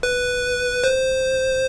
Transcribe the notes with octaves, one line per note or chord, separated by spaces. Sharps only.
B4
C5